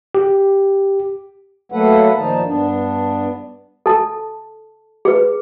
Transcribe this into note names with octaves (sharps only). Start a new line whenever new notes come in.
G4
F#3 A3 A#3 A4 B4 F#5
A#2 D#3 F3 D#4 A5
G2 B3 D4
A4 A5
G#4 B4